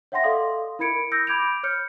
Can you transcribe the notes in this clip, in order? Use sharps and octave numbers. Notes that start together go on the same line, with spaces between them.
C#5 E5 F#5 G5 C6 A#6
A4 D5 D#5 F5 C6 D#6
E4 A#4 B5 G#6 C#7 D7
D#6 E6 G6 A#6
B5 D6 G6 G#6 D7 F7
C#5 F6 G6 C#7